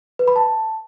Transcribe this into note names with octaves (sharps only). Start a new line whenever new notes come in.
B4
B5
A5